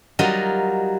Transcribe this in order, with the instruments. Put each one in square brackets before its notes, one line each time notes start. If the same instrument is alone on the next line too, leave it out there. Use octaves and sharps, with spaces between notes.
[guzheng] F#3 G3 D#4 F4 A#4 D#5